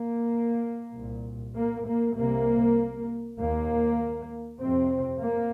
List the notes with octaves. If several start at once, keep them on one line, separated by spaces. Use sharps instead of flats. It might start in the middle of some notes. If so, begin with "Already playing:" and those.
Already playing: A#3
C2 A#2
A#3
A#3
C2 C3 A#3
D#2 A#3
F2 C3 C4
A#3